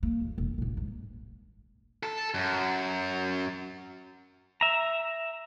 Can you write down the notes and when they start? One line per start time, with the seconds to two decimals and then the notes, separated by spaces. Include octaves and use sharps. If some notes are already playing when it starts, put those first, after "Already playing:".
0.03 A#3
0.21 F2
0.38 E1
0.58 A#1 A#2
0.77 G#2
2.03 A4
2.34 F#2
4.61 E5 A#5